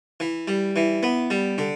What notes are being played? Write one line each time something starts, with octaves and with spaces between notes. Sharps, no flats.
E3
G3
E3
B3
G3
D3